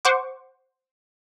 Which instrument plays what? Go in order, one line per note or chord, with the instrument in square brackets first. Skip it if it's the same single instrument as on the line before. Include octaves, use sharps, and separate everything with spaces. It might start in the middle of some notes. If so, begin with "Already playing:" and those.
[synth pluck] C5 F#5 C#6 D6